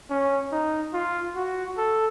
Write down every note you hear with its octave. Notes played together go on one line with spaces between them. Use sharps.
C#4
D#4
F4
F#4
A4